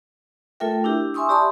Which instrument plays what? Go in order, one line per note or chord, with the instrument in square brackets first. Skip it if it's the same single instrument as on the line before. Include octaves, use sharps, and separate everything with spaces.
[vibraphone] A3 F4 A4 A#4 E5 G5
D4 E4 G4
E5 G#5 C6 C#6 D#6 E6
G4 D5 A5 B5 C6 D#6